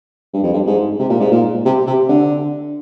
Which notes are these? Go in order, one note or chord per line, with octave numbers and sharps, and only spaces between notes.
G2
F2
G2
G#2
C3
A#2
G#2
A#2
C3
C3
D3